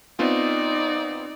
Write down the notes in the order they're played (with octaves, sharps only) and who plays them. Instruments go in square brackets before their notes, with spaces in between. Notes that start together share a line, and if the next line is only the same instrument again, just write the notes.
[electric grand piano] B3 C4 F4 [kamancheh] D#4 D5